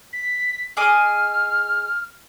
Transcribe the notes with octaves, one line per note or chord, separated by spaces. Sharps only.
B6
G#4 D#5 D6 F6